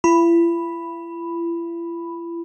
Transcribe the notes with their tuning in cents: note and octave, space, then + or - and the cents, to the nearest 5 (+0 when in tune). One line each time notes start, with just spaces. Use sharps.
E4 +45 B5 +0